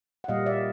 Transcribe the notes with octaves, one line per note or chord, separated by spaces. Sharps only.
F#5
A#2 G3 A#3 D#5 F5
D5 E5